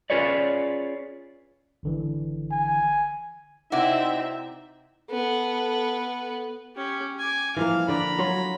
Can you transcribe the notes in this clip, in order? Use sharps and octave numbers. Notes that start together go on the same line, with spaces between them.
C#4 F4 G#4 B4 C#5 D5
G#1 D3 E3
G#5
C3 C4 D#4 E4 F#4 D5 E5
B3 A4
C#4 G4
G#5 D6
E3 F3 A#3 F5
D3 D5 A#5 B5
F#3 F4 C#5